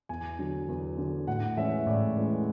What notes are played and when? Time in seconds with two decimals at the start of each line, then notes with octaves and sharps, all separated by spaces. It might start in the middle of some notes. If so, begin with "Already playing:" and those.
0.09 E2 G#5
0.39 D3 F#3
0.68 E2
0.98 D3 F#3
1.27 A2 F#5
1.57 E3 G#3 C#4 E5
1.86 A2 D5
2.17 E3 G#3 C#4